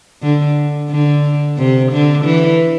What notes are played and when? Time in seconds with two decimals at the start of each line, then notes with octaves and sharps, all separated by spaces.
0.23 D3
0.91 D3
1.58 C3
1.92 D3
2.25 E3